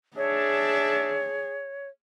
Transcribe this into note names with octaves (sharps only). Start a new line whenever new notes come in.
D4 G#4 C#5 E5 A5